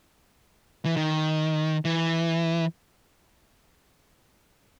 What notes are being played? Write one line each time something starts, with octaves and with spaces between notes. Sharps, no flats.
E3
D#3
E3